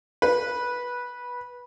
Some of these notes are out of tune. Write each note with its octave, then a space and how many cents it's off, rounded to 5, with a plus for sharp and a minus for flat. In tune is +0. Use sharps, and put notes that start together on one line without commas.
B4 -15